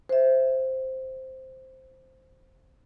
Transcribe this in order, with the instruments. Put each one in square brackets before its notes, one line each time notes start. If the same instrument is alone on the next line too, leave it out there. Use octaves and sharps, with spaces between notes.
[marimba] C5 E5